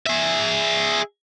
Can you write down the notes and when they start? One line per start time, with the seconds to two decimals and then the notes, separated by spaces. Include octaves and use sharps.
0.07 G#4 E5